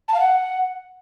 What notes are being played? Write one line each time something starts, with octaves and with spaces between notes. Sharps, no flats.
A5
F5
F#5